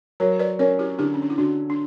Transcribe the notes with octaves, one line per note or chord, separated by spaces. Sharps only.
F#3 A#4 C#5
B4 D5
C#4 A#4 C#5
E4 G4
D3 E4 G4
C#4
D4
E4
D3 D4 F#4
D4